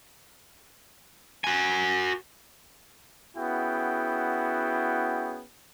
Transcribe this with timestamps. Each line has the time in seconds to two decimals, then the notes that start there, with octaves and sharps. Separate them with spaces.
1.44 F#4 G#5
3.36 B3 C#4 E4 F#4 G#4 G5